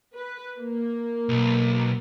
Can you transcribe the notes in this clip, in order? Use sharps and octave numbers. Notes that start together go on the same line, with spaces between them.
B4
A#3
B1